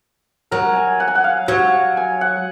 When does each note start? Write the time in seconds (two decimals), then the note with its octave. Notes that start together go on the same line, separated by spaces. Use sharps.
0.51 F#3 A#4
0.76 G#5
1.00 F#5
1.08 G#5
1.15 F#5
1.24 F5
1.48 F#3
1.97 G#5
2.21 F#5